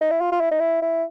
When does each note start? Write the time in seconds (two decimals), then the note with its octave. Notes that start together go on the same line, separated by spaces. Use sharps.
0.01 D#4
0.11 E4
0.21 F4
0.32 F4
0.41 E4
0.51 D#4
0.60 E4
0.82 E4